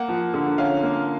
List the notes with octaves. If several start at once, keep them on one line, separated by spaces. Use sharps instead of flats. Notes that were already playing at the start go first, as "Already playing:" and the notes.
Already playing: A#3 F#5
F3
D3
C#4 F5
A#3